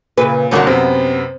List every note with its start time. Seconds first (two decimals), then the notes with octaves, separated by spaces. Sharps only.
0.18 A#2 C#3 B4
0.51 D#1 C2 D3 A#3 C#4 F#4
0.67 F#2 C3 B3 C4